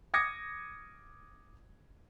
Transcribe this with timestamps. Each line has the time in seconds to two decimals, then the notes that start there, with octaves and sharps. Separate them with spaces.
0.14 D6 D#6 G#6 A#6 C#7